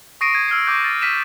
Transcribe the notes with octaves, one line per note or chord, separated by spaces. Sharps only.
C#6 D#6 A#6 C7 D7 D#7
G#6 D#7
E6 F6 G#6 C7
C#6 D6 G6
A6
E6 F6 B6 D#7 E7